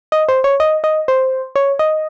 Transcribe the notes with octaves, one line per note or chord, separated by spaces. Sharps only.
D#5
C5
C#5
D#5
D#5
C5
C#5
D#5